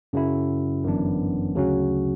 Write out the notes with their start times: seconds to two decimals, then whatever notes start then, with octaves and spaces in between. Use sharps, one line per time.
0.13 F#2 C#3 F#3 C#4 E4
0.84 G1 F#2 E3 B3 D4
1.55 D2 C#3 F#3 C#4 F#4